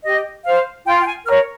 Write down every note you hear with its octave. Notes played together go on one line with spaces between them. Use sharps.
G4 D#5
C5 F5
F4 G5
G5
G#5
A#4 C#5 F6